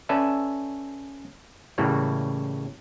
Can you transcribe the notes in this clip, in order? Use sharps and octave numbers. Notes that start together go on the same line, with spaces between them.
C#4 A4 B4 D5 E5 A5
A2 C#3 E3 G3 A#3